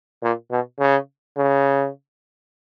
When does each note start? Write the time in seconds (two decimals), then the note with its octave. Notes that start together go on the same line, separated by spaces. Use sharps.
0.23 A#2
0.51 B2
0.79 C#3
1.37 C#3